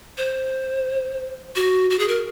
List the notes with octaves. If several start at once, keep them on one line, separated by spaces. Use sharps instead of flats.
C5
F#4
F#4
G#4
A#4